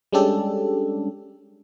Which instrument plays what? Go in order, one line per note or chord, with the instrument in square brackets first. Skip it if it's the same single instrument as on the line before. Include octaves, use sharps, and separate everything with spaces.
[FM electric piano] G3 G#3 C#4 D4 G4 A4